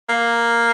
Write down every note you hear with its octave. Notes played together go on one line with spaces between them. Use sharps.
A#3